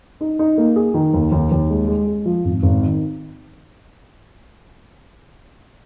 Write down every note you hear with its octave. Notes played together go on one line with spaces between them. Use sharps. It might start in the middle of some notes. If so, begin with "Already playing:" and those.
D#4
D#4
A#3
G#4
D#3
D#2
D#2
D#2
G#3
G#3
G#3
F3
G#1
G#1
D#3